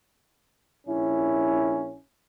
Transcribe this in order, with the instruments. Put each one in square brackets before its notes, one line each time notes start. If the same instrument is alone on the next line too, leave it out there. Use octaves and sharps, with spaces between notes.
[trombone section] A#1 C#4 E4